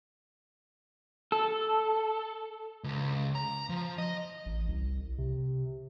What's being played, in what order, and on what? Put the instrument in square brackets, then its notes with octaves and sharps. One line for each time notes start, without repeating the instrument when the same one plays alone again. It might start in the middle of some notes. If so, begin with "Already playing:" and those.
[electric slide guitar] A4
[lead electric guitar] C#2
A#5
F3
D#5
[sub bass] A1
C2
C3